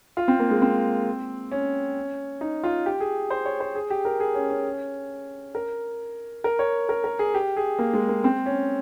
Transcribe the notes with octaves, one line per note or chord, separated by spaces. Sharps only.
F4
C4
A#3
G#3
C4
C#4
D#4
F4
G4
G#4
C5
C#5
C5
G#4
G4
A#4
G#4
C#4
C#4
A#4
A#4
C#5
A#4
A#4
G#4
G4
G#4
A#3
G#3
A#3
C4
C#4